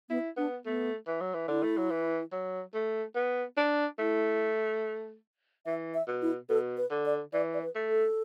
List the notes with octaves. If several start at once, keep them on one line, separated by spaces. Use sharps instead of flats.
B3 E4
B3 D4
A3 B3
E3
F#3
E3
D3 E4
A3
F#3
E3
F#3
A3
B3
D4
A3 E4
E3 E5
E5
B2
E4
B2 A4
B4
D3
D5
E3 D5
D5
B4
A3
A4